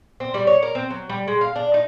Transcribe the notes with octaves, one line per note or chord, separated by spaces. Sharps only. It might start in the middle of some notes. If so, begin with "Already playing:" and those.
C4
G3
C#5
A#4
C4
F#3
G3
G#3
F5
D4
D#4